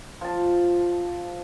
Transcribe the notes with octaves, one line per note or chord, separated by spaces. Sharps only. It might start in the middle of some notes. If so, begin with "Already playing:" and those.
F3 A5